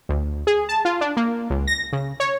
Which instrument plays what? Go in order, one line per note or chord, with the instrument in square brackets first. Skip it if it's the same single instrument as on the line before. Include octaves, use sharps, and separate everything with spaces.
[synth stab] D2
G#4
A5
F4
D4
A#3
C#2
A#6
C#3
C#5